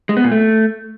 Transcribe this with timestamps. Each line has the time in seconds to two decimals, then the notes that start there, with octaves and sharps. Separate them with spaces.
0.09 G#3
0.17 B3
0.24 A#2
0.32 A3